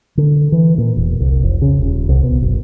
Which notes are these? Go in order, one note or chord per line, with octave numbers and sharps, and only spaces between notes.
D3
E3
A#2
E1
C2
F1
C#3
D#1
C2
B2
F#1